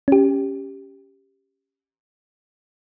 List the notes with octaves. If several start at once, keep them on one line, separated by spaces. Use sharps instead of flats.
C#4 G4